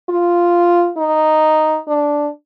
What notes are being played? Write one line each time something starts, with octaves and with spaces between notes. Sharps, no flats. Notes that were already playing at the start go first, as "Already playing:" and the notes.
F4
D#4
D4